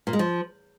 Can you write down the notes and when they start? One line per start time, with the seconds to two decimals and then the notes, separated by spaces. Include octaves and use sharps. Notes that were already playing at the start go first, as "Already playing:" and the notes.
0.07 A#2
0.13 G#3
0.19 F3